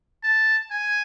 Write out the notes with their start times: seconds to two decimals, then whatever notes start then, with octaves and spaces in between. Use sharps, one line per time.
0.24 A5
0.71 G#5